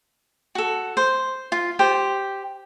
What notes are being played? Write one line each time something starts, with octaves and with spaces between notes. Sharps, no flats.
F#4 A4
C5
F4
G4 C5 G5